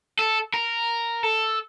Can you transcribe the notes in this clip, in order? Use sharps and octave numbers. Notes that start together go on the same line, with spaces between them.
A4
A#4
A4